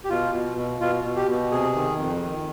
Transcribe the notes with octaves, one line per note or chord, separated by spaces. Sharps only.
G4
B2 F4
B2
B2
B2 F4
B2
G4
B2
C3 G#4
D#3
F2
D#3